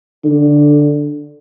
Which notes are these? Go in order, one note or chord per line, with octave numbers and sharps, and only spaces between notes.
D3